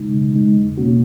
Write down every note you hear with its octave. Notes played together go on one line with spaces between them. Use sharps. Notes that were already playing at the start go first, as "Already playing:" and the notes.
Already playing: C#3 G#3 D#4
C#3
G#3 D#4
E2
B2 A#3 C#4 F#4